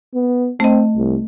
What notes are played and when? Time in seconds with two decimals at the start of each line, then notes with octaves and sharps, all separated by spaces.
0.15 B3
0.60 A3 C4 D#5
0.96 C2